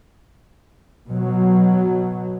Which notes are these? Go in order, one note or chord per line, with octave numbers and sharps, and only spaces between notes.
B2 F#3